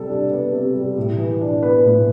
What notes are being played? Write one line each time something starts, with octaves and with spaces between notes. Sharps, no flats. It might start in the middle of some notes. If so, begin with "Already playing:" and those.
Already playing: C3 G3 A4
D4
B3
C3
G3
A2
E3
D4
B3 B4
A2